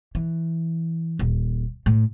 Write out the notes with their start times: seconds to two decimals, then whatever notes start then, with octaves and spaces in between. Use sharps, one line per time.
0.15 E3
1.19 D#1
1.86 A2